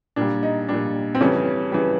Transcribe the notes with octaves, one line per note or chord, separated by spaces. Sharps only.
A#2 G3 D4
D#4
A#2 G3 D4
C4
F2 C#3 E3 G3 C#4
C#3 E3 G3